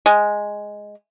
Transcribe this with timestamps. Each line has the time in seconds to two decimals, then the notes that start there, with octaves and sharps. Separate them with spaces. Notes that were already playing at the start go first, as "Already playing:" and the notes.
0.06 G#3